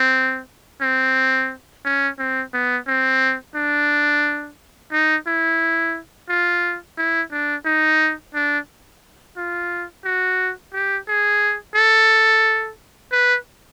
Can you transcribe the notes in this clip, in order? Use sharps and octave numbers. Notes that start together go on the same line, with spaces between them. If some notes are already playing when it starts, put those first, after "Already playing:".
Already playing: C4
C4
C#4
C4
B3
C4
D4
D#4
E4
F4
E4
D4
D#4
D4
F4
F#4
G4
G#4
A4
B4